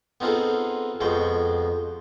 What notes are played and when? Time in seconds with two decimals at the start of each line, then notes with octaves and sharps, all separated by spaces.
0.20 B3 C4 D#4 F4 G#4 A4
1.01 F2 B2 G#3 G5